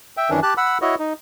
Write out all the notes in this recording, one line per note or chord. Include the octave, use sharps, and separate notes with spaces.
E5 G5
F#2 D#3 E3 C#4 D4
G4 A5 F#6
F#5 B5 E6
E4 F#4 C#5 D#5
D#4